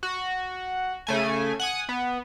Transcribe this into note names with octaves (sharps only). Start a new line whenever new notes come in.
F#4
C#3 A3 G#5
F#5 G#5 D#6
B3